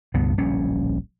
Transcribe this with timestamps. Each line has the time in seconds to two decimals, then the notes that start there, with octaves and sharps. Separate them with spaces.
0.14 C#2 G2 B2 B3
0.38 D1 A#1 G3 C#4